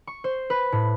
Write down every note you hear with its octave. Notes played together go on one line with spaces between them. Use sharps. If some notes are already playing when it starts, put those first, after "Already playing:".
C#6
C5
B4
A2